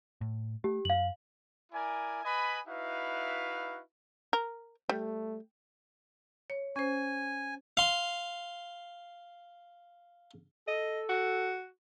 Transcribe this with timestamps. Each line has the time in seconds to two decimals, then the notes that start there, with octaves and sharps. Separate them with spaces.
0.21 A2
0.64 A3 G4
0.85 F#2 F5 F#7
1.73 E4 A#4 D5 G#5
2.24 B4 D#5 G#5 B5
2.67 D#4 E4 F#4 B4 E5 F5
4.33 A#4
4.89 G3 A3
6.50 C#5
6.76 C#4 C5 G#5
7.77 F5 C6
10.68 A4 D#5
11.09 F#4